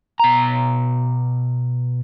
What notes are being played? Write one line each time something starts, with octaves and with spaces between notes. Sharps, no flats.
B2 A#5